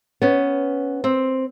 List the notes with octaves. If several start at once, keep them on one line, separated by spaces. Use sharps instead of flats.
B3 C#4
C4